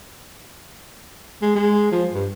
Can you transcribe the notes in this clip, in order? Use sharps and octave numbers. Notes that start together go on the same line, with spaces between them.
G#3
G#3
F3
G2